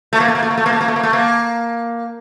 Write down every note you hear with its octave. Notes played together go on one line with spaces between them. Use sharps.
A3
A#3
A3
A#3
A3
A#3
A3
A#3
A3
A#3
A3
A#3
A3
A#3